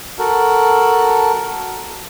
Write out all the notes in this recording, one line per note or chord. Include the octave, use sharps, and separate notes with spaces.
F#4 A4 A#4